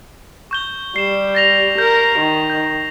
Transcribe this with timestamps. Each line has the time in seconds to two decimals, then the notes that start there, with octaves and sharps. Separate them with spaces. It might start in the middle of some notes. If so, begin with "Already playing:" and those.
0.51 C#6 G6 G7
0.96 G3 C7 E7
1.35 A6 A#6 F7
1.78 A#4 G6
2.19 D#3
2.50 G6